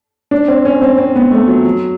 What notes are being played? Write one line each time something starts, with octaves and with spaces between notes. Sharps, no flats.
D4
C4
C#4
C4
C4
B3
A3
F#3
F#3